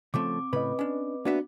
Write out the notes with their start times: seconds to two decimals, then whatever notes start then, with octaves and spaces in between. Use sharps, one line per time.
0.14 C#3 F3 A3 C4 D6
0.53 A2 C#3 B4 D#5 B5
0.79 C#4 D4
1.25 A#3 B3 D4 F#4 E5